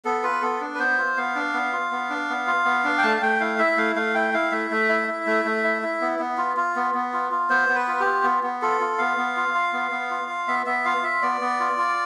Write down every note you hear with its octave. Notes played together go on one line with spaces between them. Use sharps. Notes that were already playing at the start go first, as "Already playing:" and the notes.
B3 A4
F4 B4
B3 A4
D4
B4
B3 C5
F4
B3 F5
D4
B3
F4
B3
D4
B3
F4
B3
D4
G5
A3 A5
F5
A3 G5
E4 F5
E4 E5
A3 F5
A3 F5
E4 G5
E4 F5
A3 E5
A3
E4
E4
A3
A3
E4
E4
B3
B3
F4
F4
B3
B3
F4
F4
B3 C5
B3
B4
F4
G4
F4
B3
B3
F4 A4
F4
B3 F5
B3
F4
F4
B3
B3
F4
F4
B3 E5
B3 E5
F4 F5
F4 E5
B3 D5
B3
F4
F4